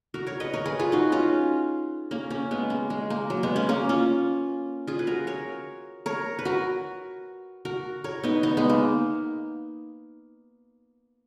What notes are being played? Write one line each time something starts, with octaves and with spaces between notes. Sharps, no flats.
F#4 A#4
A#4 C#5
B4 D#5
A#4 C#5
G#4 B4
F4 G#4
D#4 F#4
C#4 F4
A#3 C#4
A#3 C#4
G#3 B3
A#3
G#3
A#3
F#3
G#3 B3
A#3 C#4
A#3 C#4
C#4 F4
F4 G#4
B4
F#4 A#4
A#4 C#5
A#4 C#5
B4
F#4 A#4
F#4 A#4
A#4 C#5
B3 D#4
B3 D#4
G#3 B3
A#3